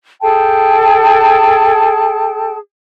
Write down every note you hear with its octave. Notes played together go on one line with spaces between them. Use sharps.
G#4 A4 G5 A5